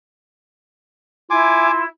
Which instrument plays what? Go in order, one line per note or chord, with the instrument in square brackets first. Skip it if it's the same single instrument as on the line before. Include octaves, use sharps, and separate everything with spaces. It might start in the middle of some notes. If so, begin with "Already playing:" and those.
[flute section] E4 [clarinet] F4 [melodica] G#5 D6